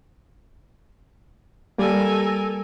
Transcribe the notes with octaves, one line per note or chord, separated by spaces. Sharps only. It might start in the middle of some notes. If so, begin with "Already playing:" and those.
G3 A#3 A4 A#4 G#5